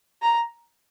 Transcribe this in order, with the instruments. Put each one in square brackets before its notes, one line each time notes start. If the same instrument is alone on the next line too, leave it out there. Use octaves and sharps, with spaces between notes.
[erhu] A#5